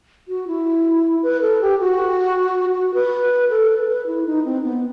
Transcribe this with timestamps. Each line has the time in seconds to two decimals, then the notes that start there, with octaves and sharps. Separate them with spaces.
0.28 F#4
0.48 E4
1.23 B4
1.42 A4
1.61 G4
1.80 F#4
2.74 F#4
2.94 B4
3.50 A4
3.69 B4
3.80 A4
3.89 B4
4.07 E4
4.26 D#4
4.45 C4
4.64 B3